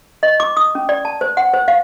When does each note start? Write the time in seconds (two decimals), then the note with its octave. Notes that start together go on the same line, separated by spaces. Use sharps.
0.23 D#5
0.40 D6
0.57 D#6
0.75 C#4
0.89 D5
1.05 A5
1.21 C5
1.37 F#5
1.54 C5
1.68 F5